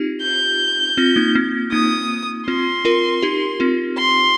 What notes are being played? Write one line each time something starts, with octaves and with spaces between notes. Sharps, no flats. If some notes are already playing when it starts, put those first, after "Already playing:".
Already playing: C4 D#4 F4 G4
G6
C4 F4
A#3 D#4
C4
A#3 D#4 D#6
C4 F4 C6
F4 A#4
D#4 G4
C4 F4
C6